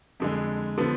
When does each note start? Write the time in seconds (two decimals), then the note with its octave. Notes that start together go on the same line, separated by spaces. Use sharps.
0.20 F2 D3 G#3
0.78 D3 F3 B3